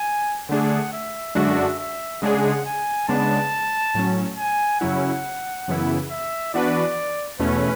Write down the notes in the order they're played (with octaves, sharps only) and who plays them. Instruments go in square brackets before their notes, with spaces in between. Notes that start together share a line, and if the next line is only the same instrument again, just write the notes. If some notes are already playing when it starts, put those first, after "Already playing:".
Already playing: [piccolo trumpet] G#5
[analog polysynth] D3 A3 D4 G#4 [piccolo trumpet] F#5
[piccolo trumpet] E5
[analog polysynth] F#2 D3 G#3 D4 F#4 [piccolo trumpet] E5
[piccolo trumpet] E5
[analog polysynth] C#3 G#3 D4 G#4 [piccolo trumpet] F#5
[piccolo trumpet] G#5
[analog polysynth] C#3 G#3 B3 D4 [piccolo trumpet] A5
[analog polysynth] A2 F#3 C#4
[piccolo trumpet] G#5
[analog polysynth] F#2 C#3 F#3 C#4 E4 [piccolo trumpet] F#5
[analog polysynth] F#2 C#3 E3 B3 E4
[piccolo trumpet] E5
[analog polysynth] E3 B3 D4 F#4 B4 [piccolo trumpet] D5
[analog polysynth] E2 B2 A3 C#4 [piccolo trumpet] B4